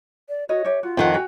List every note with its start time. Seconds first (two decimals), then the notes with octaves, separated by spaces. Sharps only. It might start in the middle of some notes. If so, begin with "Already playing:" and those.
0.29 D5
0.49 F#4 C#5 D#5
0.65 G4 C#5 E5
0.83 F4 F#4
0.97 F2 D#3 F#5 G5
1.14 F#4 G5 G#5